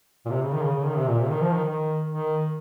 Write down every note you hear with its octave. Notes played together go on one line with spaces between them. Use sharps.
A#2
C3
C#3
D#3
C#3
C#3
D#3
C3
A#2
C3
D#3
F3
D#3
D#3
D#3